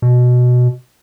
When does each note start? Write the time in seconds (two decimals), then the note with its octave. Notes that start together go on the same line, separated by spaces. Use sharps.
0.02 B2